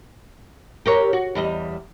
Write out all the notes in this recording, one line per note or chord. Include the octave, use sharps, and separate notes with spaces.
G4 A#4 C#5
F#4
E2 G3 D#5